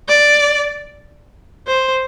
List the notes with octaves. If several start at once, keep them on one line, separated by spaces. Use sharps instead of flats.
D5
C5